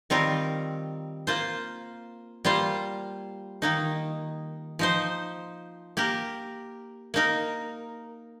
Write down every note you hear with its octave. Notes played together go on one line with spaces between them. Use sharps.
D#3 G3 C4 F4 A#4
A#3 F4 C5
G3 A#3 F4 C5
D#3 A#3 D#4
F3 D#4 C5
A#3 G4 A#4
A#3 D#4 A#4